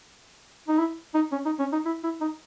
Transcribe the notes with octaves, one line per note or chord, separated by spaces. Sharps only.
D#4
E4
D#4
C#4
D#4
C#4
D#4
E4
E4
D#4